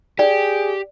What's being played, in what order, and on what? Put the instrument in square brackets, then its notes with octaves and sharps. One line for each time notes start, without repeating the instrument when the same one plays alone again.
[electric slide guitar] G4 [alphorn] G#4 [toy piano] D5